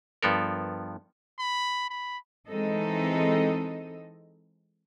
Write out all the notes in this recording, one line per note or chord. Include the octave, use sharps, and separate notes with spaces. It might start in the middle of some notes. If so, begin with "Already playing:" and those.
G2 F3 B3 A4 A#4
B5
B5
E3 G#3 C4 D#4 A4 D#5